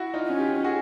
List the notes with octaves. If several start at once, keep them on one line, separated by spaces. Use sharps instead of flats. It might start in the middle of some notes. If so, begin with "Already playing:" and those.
Already playing: E4 F#4
D#4 F4
C#4
F4 G4
F#4 G#4